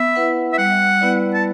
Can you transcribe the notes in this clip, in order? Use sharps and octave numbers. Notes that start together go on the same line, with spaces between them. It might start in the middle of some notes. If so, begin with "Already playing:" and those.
Already playing: B3 E5
E4 B4 F#5
E5
G3 F#5
B3 E4 B4 D5
A5